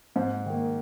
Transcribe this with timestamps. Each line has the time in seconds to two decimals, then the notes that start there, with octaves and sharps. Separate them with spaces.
0.16 G#2 C5
0.46 D#3 A#3